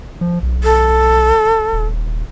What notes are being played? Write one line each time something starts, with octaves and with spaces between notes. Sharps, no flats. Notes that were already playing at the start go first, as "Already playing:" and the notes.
F3
B1
A4
D#1